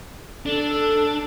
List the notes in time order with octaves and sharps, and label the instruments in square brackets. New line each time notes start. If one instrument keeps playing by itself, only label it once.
[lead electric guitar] D4 [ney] A4